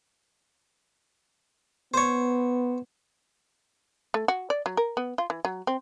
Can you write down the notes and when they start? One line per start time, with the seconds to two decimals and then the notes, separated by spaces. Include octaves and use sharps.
1.94 B3 C5 C#5
4.14 A3
4.28 F#4
4.50 D5
4.66 F#3
4.77 A#4
4.97 B3
5.18 F4
5.30 E3
5.45 F#3
5.67 C4